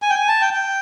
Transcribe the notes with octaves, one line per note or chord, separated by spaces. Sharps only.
G#5
G5
G#5
A5
G5
G5